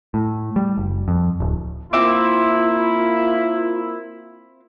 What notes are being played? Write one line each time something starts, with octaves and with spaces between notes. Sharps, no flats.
A2
G3
F#1
F2
D1
A#3 C4 E4 F4 E5 D6